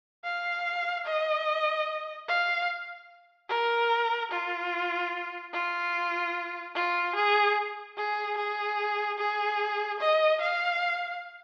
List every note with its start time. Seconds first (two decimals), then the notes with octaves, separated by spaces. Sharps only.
0.24 F5
1.06 D#5
2.28 F5
3.49 A#4
4.31 F4
5.53 F4
6.75 F4
7.16 G#4
7.97 G#4
8.37 G#4
9.18 G#4
10.00 D#5
10.41 F5